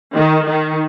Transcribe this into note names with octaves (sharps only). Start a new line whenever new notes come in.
D#3
D#3